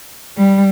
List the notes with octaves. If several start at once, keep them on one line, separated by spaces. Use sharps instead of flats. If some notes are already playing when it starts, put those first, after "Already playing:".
G3